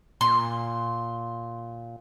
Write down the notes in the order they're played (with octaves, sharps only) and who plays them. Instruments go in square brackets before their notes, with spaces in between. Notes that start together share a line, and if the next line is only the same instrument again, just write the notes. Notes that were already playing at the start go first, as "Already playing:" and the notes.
[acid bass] A#2 [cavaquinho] C6